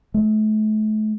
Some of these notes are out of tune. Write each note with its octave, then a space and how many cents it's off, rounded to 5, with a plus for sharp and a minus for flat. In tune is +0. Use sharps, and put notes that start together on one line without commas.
A3 -35